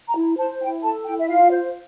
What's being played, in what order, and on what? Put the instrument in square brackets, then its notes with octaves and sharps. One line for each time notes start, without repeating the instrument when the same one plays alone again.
[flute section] A#5
E4
C5 A5
E4 G5
A4 A5
E4 G5
E5
F4 F5
C5